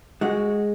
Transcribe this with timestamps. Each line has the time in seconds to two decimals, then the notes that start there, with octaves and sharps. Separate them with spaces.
0.21 G#3 F#4